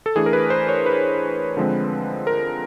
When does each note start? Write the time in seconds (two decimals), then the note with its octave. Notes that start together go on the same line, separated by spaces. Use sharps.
0.06 A4
0.15 E3 A3 D4 G#4
0.26 A#4
0.33 B4
0.50 C5
0.69 C#5
0.86 B4
1.57 D3 F3 G#3 C4
2.27 A#4